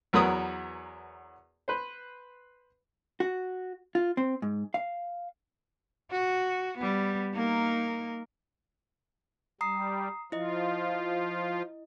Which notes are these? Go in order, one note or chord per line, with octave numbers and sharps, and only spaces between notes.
E2 F#3 B3 A#4 B5 D#6
B4 C5
F#4
F4
C4
G#2
F5
F#4
G3 B3
A#3 D#4 A#4
G3 A#5 D#6 C7
F3 E4 F4 D#5